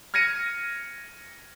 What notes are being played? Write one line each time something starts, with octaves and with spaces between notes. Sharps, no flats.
F6 G#6 A#6 C#7 D#7